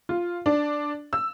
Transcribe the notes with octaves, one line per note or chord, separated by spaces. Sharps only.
F4
D4
E6